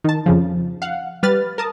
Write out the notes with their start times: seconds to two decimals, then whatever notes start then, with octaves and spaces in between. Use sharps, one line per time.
0.04 D#3 A5
0.26 F2 C#3 F3
0.82 F5 F#5
1.23 G3 B4 F6 A6
1.58 A#4 A5 D#6